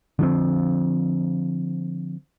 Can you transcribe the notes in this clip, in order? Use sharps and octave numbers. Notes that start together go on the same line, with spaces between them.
D3 F3 C4